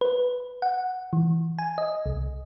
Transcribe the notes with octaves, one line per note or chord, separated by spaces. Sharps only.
B4
F#5
E3
G#5
D#5
C2